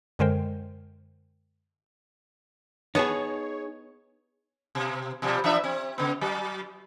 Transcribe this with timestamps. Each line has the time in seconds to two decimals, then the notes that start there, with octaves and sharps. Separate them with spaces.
0.19 F#2 D3 G#3 A#4 C5 G5
2.95 B3 D#4 G#4 C#5 A5
4.75 B2
5.22 B2 F3 G3
5.44 E3 D4 E5
5.64 C4
5.98 C#3 B3
6.21 F#3